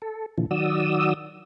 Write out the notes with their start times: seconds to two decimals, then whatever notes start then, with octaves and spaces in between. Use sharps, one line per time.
0.02 A4
0.38 A#2 D3 E3 F3
0.51 D#3 F#3 F#4 D5 D#6 E6